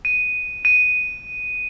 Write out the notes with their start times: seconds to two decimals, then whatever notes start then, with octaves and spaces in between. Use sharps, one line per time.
0.05 D#7
0.65 D#7